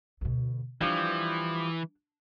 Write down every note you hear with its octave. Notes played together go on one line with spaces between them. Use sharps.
D2 B2
E3 F3 G3 D4